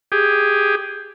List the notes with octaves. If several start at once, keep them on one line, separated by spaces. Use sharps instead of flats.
G4 G#4